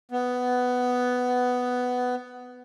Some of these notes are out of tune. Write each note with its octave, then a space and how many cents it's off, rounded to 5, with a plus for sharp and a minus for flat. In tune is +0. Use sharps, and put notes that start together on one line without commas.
B3 +10